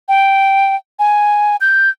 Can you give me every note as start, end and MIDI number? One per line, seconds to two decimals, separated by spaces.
0.08 0.75 79
0.99 1.56 80
1.61 1.90 91